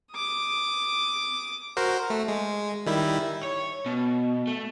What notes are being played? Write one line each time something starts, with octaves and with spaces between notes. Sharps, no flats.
D6 D#6
F#4 A#4 C5
A3
G#3
D#3 G3 E4
C#5
B2
A3